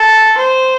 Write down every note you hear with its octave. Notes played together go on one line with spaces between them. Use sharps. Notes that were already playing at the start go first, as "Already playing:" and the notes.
Already playing: A4
C5